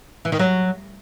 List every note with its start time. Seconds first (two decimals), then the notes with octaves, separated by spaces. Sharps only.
0.25 E3
0.32 D#3
0.39 F#3